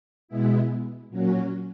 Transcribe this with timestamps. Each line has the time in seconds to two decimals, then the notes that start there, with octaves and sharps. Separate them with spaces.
0.28 B2 G#3 B3 E4
1.10 A#2 F#3 C#4 F#4